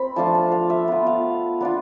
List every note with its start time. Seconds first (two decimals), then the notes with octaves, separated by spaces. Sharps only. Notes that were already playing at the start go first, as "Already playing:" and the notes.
Already playing: C4 B5
0.16 F3 A3 D4 F4 A5
0.35 A5
0.52 F5
0.70 E5
0.88 B3 F4
1.07 F5
1.61 B3 D4 F4